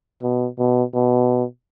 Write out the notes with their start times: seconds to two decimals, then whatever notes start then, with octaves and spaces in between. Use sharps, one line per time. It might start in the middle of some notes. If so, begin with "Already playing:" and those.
0.23 B2
0.59 B2
0.95 B2